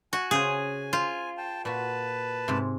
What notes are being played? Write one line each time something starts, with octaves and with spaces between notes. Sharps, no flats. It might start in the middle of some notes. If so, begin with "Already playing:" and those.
F#4 G#5
C#3 G#4 C5
F4 C5
G5 A5
A#2 F#4 B4 A5
G#2 C3